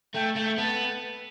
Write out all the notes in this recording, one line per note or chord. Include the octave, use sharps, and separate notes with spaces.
A3 G5
A3
B3 A5